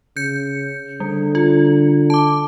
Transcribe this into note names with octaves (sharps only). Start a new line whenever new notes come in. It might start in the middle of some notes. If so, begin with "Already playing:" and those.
C#3 G6 C#7
D3 G3
F4
A5 D6